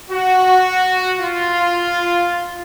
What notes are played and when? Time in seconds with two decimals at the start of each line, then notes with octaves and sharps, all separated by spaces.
0.10 F#4
1.19 F4